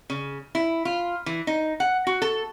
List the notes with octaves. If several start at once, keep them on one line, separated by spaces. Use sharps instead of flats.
C#3
E4
F4
E3
D#4
F#5
F#4
A4